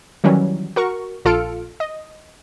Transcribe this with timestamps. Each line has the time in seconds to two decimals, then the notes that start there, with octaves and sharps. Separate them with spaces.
0.24 D#3 E3 F#3 G3 C#4
0.76 F#4 A#4 C#6
1.25 A#1 F4 A4 F6 C#7 D7
1.80 D#5